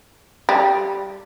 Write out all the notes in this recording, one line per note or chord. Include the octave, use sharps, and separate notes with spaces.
G3